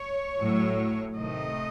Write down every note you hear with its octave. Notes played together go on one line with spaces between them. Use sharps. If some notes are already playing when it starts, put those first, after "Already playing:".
Already playing: C#5
A2 F#3 A3
C3 D#3 A3 D#5